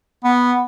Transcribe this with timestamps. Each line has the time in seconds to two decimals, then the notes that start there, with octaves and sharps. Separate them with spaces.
0.24 B3